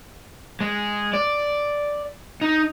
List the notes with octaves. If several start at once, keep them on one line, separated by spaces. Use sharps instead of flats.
G#3
D5
D#4